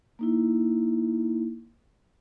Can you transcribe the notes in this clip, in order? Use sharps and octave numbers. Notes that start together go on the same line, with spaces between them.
A#3 D#4 E4